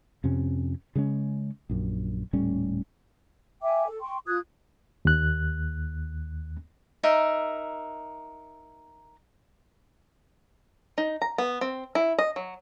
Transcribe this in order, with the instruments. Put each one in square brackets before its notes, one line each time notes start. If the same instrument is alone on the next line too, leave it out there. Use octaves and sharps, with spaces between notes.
[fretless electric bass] F2 C3 C#4
C#3 G3 G#3 C#4
A#1 F#2
D#1 A2 G3 C#4
[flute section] E5 G5 G#5 D6
A4
G5 C6 C#6
F4 D#6 F#6 G#6
[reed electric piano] D#2 F#6
[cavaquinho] D#4 A#4 E5
[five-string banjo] D#4
A#5
B3
C4
E4
D#5
F#3